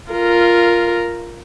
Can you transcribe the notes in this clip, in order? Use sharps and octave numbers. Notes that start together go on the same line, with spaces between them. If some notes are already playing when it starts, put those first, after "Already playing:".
F4 A#4